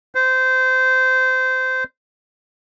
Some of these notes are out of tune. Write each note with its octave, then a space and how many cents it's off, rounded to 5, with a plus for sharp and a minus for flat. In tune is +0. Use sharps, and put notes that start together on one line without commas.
C5 -20